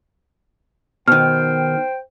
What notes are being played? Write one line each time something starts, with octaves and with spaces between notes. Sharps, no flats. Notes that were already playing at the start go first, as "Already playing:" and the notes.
B2 D#3 C5 G5 F6